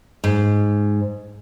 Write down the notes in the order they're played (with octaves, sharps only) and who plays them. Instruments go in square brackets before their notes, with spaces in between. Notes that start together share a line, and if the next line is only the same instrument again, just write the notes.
[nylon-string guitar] G#2